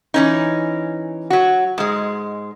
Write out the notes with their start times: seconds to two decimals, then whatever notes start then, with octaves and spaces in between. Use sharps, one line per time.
0.14 E3 C#4 D#4
1.30 F#3 F#4
1.78 G#2 G#3